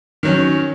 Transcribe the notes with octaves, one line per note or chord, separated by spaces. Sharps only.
D#3 F#3 C#4